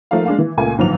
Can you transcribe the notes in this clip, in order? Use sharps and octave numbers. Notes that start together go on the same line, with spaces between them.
F3 A3 A#3 D#4 F5
G#3 D4 F5
E3
C#2 A#2 A3 G#5
G1 G#2 F3 F#3 F7